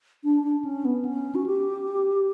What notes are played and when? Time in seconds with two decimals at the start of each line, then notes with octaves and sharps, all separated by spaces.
0.24 D4
0.44 D4
0.65 C#4
0.85 B3
1.05 C#4
1.35 F#4
1.46 G4